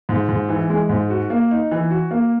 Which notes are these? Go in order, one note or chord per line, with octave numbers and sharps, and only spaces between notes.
G#2
G#2
E3
G#3
G#2
F#4
A#3
D#4
E3
F#4
A#3